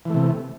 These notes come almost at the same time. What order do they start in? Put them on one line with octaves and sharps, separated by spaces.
E3 A3 C3